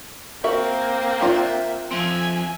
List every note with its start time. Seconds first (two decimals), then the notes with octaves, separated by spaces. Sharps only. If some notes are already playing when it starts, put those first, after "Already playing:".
0.44 A#3 C4 F#4 A#4 E5
1.21 D4 F4 A#4 E5
1.91 F3 C4 E5 G#5